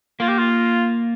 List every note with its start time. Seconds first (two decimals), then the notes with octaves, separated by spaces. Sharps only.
0.20 A#3 F4
0.29 G4
0.39 F4